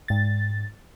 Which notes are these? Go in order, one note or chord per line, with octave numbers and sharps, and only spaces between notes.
G#2 A6